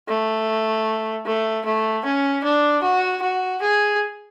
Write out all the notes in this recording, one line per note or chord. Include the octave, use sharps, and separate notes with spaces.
A3
A3
A3
C#4
D4
F#4
F#4
G#4